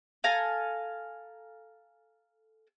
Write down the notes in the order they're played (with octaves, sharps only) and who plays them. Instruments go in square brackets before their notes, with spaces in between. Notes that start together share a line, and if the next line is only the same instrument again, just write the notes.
[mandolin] A4 F5 G#5 A#5